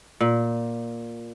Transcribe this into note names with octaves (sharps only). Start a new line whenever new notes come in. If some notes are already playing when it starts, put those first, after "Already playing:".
A#2